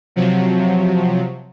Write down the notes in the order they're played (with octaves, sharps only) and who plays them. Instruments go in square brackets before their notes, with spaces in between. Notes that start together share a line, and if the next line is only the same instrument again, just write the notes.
[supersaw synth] C3 F3 F#3